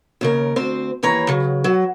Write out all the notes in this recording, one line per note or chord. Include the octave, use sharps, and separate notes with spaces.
D#2 C#3 A#4
D2 C4 C5
D#2 E3 C#5 A#5
C#3 F#3
F#3